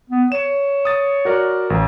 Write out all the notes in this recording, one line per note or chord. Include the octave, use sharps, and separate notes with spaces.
B3
C#5 E7
D#6 A6
F#4 A#4 D5
A1